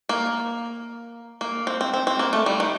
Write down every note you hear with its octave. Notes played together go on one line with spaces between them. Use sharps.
A#3
A#3
C4
C4
C4
C4
A#3
A3
G3
D#3